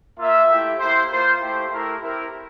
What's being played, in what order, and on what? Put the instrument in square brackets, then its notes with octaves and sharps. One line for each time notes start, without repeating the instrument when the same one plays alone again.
[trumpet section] A#3 F4 E5
A3 E4 G4
A#3 E4 G4 C5
A#3 F4 C5
A3 E4 G4 C5
A3 E4 G4 A#4
C4 E4 G4 A#4